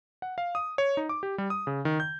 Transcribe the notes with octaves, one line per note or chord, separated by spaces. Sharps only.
F#5
F5
D#6
C#5
D#4
D6
G4
G3
D#6
C#3
D#3
G6